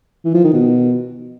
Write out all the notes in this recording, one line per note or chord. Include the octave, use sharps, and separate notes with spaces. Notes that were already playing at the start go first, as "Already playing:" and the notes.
E3
F3
D#3
B2